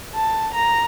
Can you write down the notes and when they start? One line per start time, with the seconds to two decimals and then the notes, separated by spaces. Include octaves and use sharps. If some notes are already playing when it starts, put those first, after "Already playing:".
0.14 A5
0.54 A#5